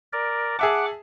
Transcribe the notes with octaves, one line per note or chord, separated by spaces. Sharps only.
A#4 D5
G#4 E5 F#5 A5 D6